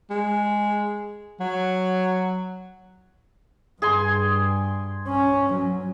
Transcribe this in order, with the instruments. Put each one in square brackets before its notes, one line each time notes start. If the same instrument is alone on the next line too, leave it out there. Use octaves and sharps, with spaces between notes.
[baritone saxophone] G#3
F#3
[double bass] G2 [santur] G#4 G#5 C6
[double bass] C#4
F#3